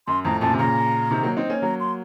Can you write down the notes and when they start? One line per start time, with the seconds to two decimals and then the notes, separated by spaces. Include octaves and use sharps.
0.07 F#2 C6
0.25 F2 A2 A#5
0.41 F#2 A#2 A5
0.53 C3
0.59 A#2 C#3 A#5
1.11 C3 D#3
1.23 F#3 A#3
1.37 C4 D#4
1.50 A#3 C#4
1.62 F#3 A#3 A#5
1.80 C6